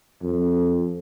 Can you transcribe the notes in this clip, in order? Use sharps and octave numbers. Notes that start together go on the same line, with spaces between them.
F2